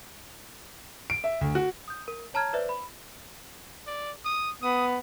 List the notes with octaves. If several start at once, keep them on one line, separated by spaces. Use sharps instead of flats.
D7
E5
D2
F#4
D#6 G6
A#4
C#5 A5 A#5 F6 G#6
B4 C5 D5 E5
B5
D5
D#6
B3 D#6